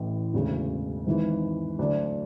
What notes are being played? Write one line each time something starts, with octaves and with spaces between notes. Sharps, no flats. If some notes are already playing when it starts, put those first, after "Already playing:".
Already playing: A1 A2 E3
E1 D2 C#3 F#4
G#1 G#2 E3
D2 D3 F#3 D4